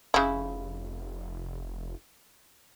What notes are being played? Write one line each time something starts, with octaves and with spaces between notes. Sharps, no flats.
F1 C#3 E4